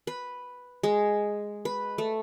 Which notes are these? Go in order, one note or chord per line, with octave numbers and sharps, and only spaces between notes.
B4
G#3
B4
A3